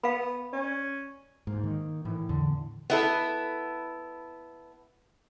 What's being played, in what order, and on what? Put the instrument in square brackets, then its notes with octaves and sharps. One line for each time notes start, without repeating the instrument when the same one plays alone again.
[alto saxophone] B3 [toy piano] F5 B5
[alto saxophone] C#4 [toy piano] D5
[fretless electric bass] G#2 [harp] A#3
[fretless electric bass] D#3
[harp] A2 [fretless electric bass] E3
[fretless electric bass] E2 [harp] D3
[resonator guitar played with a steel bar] B3 E4 A4